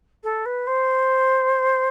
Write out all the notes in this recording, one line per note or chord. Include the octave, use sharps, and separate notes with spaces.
A4
B4
C5